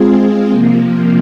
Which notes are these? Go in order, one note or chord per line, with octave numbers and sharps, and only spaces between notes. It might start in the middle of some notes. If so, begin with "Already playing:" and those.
Already playing: G#3 C4 F4 G#4
C3 F3 A#3